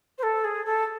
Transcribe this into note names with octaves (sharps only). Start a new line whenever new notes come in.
C5
A4
G#4
A4